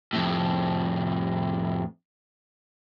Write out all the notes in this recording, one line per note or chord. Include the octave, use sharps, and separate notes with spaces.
F2 A2